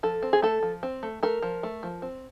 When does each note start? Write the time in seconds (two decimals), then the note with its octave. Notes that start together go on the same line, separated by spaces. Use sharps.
0.03 F3 A4
0.23 C4
0.33 G#4
0.42 A3 A4
0.63 F3
0.83 C4
1.03 A3
1.23 A3 A#4
1.42 F3
1.63 A3
1.83 F3
2.02 C4